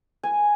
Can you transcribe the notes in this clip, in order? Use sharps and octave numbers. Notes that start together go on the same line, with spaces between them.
G#5